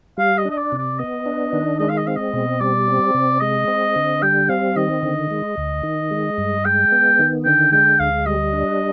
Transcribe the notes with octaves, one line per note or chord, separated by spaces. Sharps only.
G3 F5
D#5
D4
D#5
D5
C3
D5
B3 D#5
D4
D#3
G#3 D#5
F5
D#5
C4 F5
D#5
B2
G3 D5
C4
C3
G#3 D#5
C4
D3
G3 G5
C4 F5
D#3 D#5
D3
G#3
D2
D#3
G#3
G2
G#3 G5
B3
D#3
D3 G5
G#3 G5
D2 F5
G3 D#5
D4